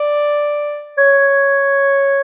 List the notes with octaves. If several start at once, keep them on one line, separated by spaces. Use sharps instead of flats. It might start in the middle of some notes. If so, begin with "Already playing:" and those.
Already playing: D5
C#5